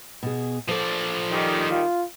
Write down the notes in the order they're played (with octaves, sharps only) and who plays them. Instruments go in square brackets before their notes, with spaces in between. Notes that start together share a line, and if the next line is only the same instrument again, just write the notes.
[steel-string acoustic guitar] B2 G#4
[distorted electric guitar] F3 D5 [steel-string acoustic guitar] A4 C5
[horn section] A#2 D#3 G3
[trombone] F4